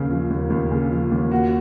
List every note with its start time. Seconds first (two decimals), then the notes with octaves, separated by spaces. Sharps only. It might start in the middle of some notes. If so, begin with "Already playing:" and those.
Already playing: D#2 C#3
0.10 F3
0.30 D#2
0.50 D#2
0.71 C#3
0.91 F3
1.11 D#2
1.31 F#4